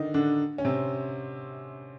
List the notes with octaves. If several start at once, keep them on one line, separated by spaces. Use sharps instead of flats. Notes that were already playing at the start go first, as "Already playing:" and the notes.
Already playing: D3 D#3 D4 D#4
D3 D4
C#4
C3 C4